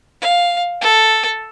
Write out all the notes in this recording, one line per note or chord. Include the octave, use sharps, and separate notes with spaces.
F5
A4